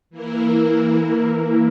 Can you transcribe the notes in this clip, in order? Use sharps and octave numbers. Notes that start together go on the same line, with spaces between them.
E3 A#3 E4 A#4